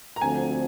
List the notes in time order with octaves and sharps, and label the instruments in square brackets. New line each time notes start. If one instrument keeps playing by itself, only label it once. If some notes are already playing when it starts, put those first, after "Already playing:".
[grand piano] A#5
[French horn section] D2 D3 F3 C4 [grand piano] G#5